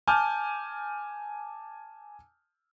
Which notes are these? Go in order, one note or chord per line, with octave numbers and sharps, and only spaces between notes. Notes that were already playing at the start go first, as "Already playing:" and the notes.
G#5 A5 D6 F6 G6